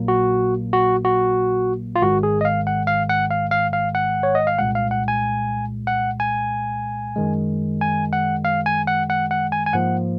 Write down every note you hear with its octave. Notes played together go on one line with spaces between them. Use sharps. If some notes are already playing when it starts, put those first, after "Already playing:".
Already playing: A#1 A#2 F#3 A#3
F#4
F#4
F#4
F4
G#1 G#2 D#3 G#3 F#4
G#4
D#5
F5
F#5
F5
F#5
F5
F5
F5
F#5
C#5
D#5
F5
C2 A#2 G#3 F#5
F5
F#5
G#5
F#5
G#5
F#2 D#3 G#3
G#5
F#5
F5
G#5
F#5
F#5
F#5
G#5
G#5
G#2 F3 A#3 F#5